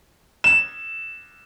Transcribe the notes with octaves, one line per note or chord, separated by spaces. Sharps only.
E7